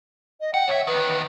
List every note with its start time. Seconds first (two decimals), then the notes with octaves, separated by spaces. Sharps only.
0.41 D#5
0.54 F#5 G5
0.68 D2 C#5 E5
0.87 E2 D#3 B4